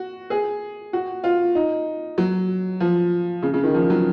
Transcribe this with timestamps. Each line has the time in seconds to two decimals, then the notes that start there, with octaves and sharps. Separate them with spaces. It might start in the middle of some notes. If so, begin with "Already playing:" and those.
Already playing: F#4
0.30 G#4
0.93 F#4
1.24 F4
1.55 D#4
2.18 F#3
2.80 F3
3.43 C#3
3.54 C#3
3.63 D#3
3.74 F3
3.90 F#3